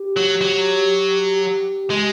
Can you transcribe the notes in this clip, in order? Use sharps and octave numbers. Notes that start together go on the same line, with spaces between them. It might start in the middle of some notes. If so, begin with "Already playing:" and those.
Already playing: G4
F#3
F#3
G#3